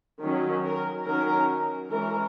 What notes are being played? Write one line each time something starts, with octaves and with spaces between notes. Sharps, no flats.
D#3 F#3 C#4
A#4
D#3 F#3 C#4 A#4
E3 G#3 C#4 A#4